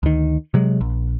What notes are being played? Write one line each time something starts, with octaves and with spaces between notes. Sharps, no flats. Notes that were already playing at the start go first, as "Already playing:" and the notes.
D2 D#3
C3 F#3 G#3
A#1